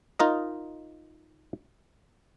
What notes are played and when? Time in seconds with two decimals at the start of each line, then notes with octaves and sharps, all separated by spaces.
0.19 D#4 F4 A#4 D#5